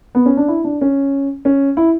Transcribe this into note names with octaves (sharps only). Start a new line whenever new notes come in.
B3
C#4
D4
E4
D4
C#4
C#4
E4